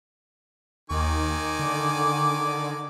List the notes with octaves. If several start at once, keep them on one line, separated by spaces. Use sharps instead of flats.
D#2 D#3 G#5 D6
D3